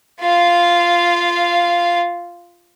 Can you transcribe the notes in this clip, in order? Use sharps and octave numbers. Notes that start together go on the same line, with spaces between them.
F4 F5